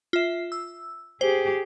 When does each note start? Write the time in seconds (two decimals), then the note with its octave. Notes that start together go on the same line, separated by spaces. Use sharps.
0.13 F4 E5
0.52 E6
1.21 G4 G#4 C5